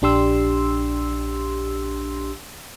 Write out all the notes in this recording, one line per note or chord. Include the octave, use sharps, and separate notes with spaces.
A#1 D4 G4 C6 E6